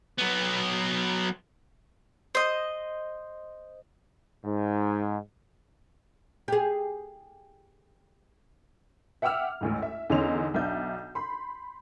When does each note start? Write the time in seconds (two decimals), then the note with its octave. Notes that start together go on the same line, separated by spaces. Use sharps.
0.19 F#3 B3
2.35 C5 D#5
4.44 G#2
6.48 G4 G#4
9.22 E5 F#5 G5 D6 E6 F6
9.61 A1 D2 G#2
9.82 E5
10.10 E2 D3 C#4 D#4 C6 F7
10.54 B1 D4 E5 G6
11.15 B5 C6